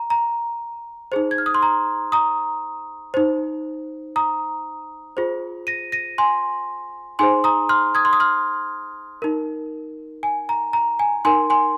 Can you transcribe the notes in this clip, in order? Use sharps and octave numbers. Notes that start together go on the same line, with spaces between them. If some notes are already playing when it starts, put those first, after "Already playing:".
Already playing: A#5
A#5
D#4 G#4 C5
G#6
F6
D#6
C6
A#5
A#5 D#6
D#4 C5
A#5 D#6
F4 G#4 C5
A#6 D#7
A#6 D#7
G#5 C6
D#4 G#4 C5 G#5 C6
A#5 D#6
C6 F6
D#6 G#6
C6
D#6
C6 F6
D#4 A#4
G#5
A#5
A#5
G#5
D#4 A#4 G#5 C6
G#5 C6